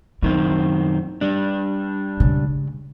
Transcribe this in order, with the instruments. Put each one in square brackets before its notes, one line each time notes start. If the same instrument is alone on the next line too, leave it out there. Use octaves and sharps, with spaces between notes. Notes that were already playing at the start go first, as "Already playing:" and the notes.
[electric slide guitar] F#2 D#3 C4 [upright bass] E4
[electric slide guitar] G3 D4
[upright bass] C#3 G#3